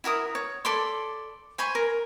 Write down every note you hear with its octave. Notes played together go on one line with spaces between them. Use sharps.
E4 F#4 A#4 D#6
C#5
A4 D5 B5 C6
C5 G#5 B5 C#6
A#4